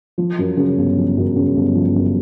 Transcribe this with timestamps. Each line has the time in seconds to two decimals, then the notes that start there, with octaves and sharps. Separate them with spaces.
0.18 F3
0.39 F#2
0.57 C#3
0.78 G1
0.97 F3
1.17 F#2
1.36 C#3
1.56 G1
1.75 F3
1.96 F#2